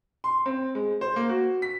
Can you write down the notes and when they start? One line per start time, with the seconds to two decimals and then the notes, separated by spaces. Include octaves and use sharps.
0.24 C6
0.46 C4
0.75 G#3
1.01 C5
1.16 A#3
1.29 F#4
1.62 B6